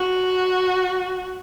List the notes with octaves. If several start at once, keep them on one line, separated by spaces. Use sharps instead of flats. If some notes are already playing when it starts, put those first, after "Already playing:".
Already playing: F#4